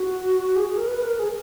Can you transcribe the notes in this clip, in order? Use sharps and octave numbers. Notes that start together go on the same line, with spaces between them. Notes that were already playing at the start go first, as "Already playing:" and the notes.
Already playing: F#4
G#4
G#4
A#4
B4
B4
A#4
G#4